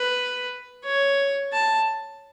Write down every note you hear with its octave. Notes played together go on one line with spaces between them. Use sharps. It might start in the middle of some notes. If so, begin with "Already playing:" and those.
Already playing: B4
C#5
A5